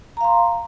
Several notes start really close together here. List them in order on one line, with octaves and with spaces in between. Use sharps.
A#5 F5 C6